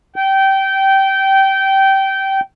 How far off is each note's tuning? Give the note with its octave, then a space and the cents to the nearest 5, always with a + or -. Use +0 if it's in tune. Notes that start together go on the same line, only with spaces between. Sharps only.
G5 -20